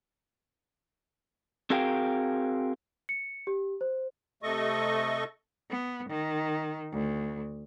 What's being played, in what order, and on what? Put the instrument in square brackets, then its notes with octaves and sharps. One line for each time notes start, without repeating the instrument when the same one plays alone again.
[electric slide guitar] C4 F#4 G#4 A#4 F5 G5
[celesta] C#7
G4
C5
[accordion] C3 A3 A4 D#5 C#6
[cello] B3
D#3
D2